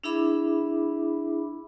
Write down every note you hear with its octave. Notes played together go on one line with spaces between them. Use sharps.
D4 E4 G#4 E5 B5 D6